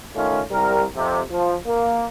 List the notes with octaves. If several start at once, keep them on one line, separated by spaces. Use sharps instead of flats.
D#3 A3 C#4 F4
C2 G3 A#4
F2 C3
F3
A#3